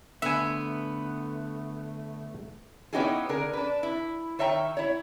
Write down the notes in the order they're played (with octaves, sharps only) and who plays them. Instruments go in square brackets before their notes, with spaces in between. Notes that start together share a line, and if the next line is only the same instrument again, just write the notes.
[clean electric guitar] D3 [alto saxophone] A3 [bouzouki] B3 [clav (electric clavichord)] E5 G#5
[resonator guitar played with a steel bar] B3 C#4 D#4 E4 G4 G#4
D3 G#4 A#4
D4 B4
E4
D#3 C#5 E5 G5 A#5
E4 C#5